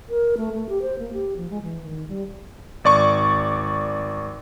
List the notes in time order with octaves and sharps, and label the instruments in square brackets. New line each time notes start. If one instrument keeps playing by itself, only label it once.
[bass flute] A#4
A3
A3
G4
C5
A#3
G4
F3
G#3
E3
D#3
G3
[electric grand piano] G#1 D5 C#6